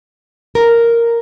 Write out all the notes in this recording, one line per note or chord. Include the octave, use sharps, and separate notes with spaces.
A#4